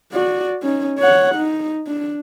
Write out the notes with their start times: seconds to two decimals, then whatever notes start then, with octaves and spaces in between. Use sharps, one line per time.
0.12 F#4 D5
0.63 C#4 D#4
0.99 C#5 F#5
1.35 D#4
1.87 D4